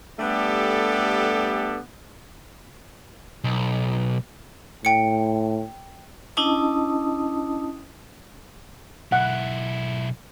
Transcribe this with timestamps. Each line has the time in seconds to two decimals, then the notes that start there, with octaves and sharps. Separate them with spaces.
0.19 G3 A3 B3 D4 G4 A4
3.44 B1
4.85 A2 G5 C#7
6.37 C#4 D4 E4 D#5 A5 D#6
9.12 B1 E4 F#5